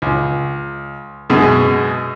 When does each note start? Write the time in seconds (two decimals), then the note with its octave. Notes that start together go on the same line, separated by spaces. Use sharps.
0.02 C#2
1.30 F#2 B2 G#3